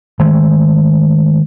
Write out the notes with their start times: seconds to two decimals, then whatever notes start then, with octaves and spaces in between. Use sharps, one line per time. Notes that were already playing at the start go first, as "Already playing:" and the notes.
0.19 D#3 G#3 A3